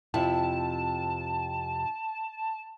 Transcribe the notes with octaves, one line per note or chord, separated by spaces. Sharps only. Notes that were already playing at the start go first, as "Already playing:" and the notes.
F2 C3 E4 A5